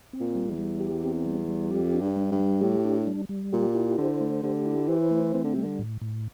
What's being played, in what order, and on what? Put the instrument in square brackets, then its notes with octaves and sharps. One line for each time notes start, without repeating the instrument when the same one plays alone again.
[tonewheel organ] C4
[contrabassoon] A#2
[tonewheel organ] G3
[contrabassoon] E2
[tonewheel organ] G3
G4
C4
G3
G3
[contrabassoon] F2 [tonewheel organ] G4
[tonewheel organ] D4
[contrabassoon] G2
[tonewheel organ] G3
[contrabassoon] G2
[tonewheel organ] G3
[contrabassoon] A2 [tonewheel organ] G4
[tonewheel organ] D4
G3
G3
[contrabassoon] A#2 [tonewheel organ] G4
[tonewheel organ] E4
[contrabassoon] D3 [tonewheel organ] C5
[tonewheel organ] A3
[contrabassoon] D3 [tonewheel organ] G4
[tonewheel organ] E4
[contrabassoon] E3 [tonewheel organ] C5
[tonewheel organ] A3
[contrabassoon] E3 [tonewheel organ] C4
[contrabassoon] D3
[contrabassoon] C3 [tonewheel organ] G3
[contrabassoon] D3
[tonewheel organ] A2
A2